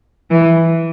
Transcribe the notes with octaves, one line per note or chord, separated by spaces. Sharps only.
E3